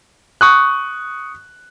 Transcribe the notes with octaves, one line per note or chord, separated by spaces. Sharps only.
C#6 D#6 F#6